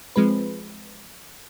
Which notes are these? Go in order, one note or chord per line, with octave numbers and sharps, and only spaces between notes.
F3 G#3 C4 B4